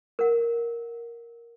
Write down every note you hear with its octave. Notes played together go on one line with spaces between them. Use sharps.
A#4 F#5